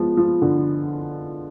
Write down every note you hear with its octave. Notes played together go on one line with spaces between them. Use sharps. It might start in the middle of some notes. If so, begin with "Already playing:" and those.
Already playing: F3 G#3 B3
F3
D3